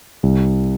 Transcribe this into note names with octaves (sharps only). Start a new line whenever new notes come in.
C2